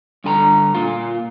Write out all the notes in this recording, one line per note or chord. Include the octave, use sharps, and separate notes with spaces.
G2 D3 G#5 A#5
A#2 F4